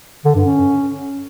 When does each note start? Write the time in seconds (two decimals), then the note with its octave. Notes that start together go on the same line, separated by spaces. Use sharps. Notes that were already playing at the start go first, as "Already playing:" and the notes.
0.25 D3
0.35 G2
0.45 C#4